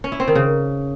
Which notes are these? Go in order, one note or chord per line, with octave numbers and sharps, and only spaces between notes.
C#4
E4
C4
D#3
C#3